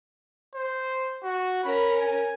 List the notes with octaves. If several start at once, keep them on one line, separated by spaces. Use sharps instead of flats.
C5
F#4
C#4 A#4 B5
G#5